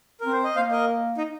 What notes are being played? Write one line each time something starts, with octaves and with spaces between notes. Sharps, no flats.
C4 A#4
C5
D#5
A#3 C5 F5
A#4 D#5
D#4